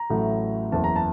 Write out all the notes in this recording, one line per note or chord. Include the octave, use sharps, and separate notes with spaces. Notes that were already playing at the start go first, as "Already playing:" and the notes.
Already playing: A#5
A1 A2 F#3 A3
F#1 E2 C#3 E3 A5
A#5
A5